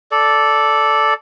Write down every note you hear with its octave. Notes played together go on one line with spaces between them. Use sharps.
A4 D5